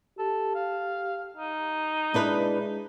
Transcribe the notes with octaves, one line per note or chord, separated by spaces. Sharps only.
G4 A4
F5
D#4
G#3 D4 E4 B4